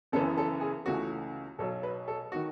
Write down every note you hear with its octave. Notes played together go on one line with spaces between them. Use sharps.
F#1 F#2 C#3 E3 B3 A4
A4
G#4
C#2 C#3 E3 A3 F#4
B1 B2 F#3 A4
B4
A4
D#3 F#4